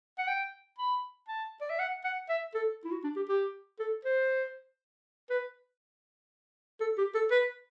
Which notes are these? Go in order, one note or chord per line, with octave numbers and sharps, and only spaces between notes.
F#5
G5
B5
A5
D5
E5
F#5
F#5
E5
A4
E4
F#4
D4
G4
G4
A4
C5
B4
A4
G4
A4
B4